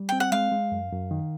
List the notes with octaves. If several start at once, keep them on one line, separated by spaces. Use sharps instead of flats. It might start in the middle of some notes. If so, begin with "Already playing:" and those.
Already playing: G3
C4 G5
F#5
G#3 F5
G#3
F#2
F#2
D#3